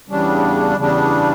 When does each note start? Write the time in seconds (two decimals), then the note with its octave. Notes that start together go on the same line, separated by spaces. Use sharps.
0.08 E2 C#3 G3 D4
0.77 E2 C#3 G3 D4